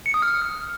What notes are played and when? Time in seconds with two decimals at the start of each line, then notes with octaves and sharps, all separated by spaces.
0.06 C#7
0.14 D#6
0.22 F6